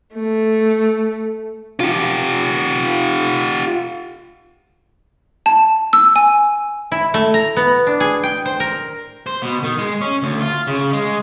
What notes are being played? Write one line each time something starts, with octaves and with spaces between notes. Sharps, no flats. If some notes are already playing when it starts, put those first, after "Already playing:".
A3
F4 G4
A5
E6
G#5
E4
A3
A#5
B3
D4
G#4
G5
C5
A#4
C5
B2
D#3
G#3
C#4
D2
F4
C#3
G#3